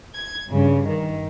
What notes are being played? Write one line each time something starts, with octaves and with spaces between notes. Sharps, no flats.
G#6
G2 C#3
D#3